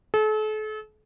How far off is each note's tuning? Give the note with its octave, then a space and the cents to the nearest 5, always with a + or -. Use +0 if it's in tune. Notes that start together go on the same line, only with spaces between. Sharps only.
A4 -40